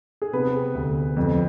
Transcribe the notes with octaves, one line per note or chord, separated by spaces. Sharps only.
G#4
C3 B3 B4
D2
F2